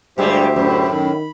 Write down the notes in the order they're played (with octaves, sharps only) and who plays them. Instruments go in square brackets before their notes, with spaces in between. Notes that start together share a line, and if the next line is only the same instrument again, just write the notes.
[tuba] D2 [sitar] G2 G3 G#3 [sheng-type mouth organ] G4 C5 E5
[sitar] F#2 A2
[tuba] D#3 [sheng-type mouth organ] B5